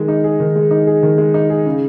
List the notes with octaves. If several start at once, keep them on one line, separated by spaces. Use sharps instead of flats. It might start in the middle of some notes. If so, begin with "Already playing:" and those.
Already playing: D#3 G#3
D#4
G#4
D#3
G#3
D#4
G#4
D#3
G#3
D#4
G#4
C#3